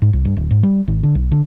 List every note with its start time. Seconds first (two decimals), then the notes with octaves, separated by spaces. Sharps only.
0.02 G#2
0.13 C2
0.25 G2
0.37 D1
0.51 G#2
0.63 G3
0.88 G#1
1.03 D3
1.15 B1
1.31 D3